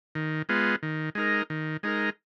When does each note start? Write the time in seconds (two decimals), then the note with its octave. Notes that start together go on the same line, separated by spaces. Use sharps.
0.15 D#3
0.49 G#3 B3 F4
0.83 D#3
1.15 G#3 D#4 A#4
1.50 D#3
1.83 G#3 D#4 A#4